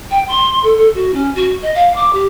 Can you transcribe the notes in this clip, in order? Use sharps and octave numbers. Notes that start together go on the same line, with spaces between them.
G5
C6
A4
A4
F#4
C#4
F#4
D#5
F5
D6
G4